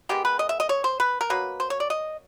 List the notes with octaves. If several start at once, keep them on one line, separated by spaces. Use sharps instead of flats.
D#3 G#3 B3 G4
B4
D#5
E5
D#5
C#5
C5
B4
A#4
B2 F#3 A#3 B4
C5
C#5
D5
D#5